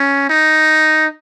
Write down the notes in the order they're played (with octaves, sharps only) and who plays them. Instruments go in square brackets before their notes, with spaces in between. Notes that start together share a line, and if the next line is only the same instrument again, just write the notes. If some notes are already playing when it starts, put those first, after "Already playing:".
Already playing: [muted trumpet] C#4
D#4